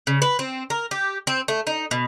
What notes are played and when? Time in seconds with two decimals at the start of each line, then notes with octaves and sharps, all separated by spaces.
0.07 C#3
0.22 B4
0.39 C4
0.70 A#4
0.91 G4
1.27 C4
1.48 A3
1.67 D#4
1.91 B2